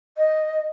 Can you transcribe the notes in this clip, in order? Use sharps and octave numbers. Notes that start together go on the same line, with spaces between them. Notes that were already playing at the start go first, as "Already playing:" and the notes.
D#5